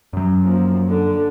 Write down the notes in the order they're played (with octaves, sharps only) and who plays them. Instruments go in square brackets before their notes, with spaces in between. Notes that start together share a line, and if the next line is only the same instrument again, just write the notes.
[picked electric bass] F#2 F#3
[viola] F3 A#3
D3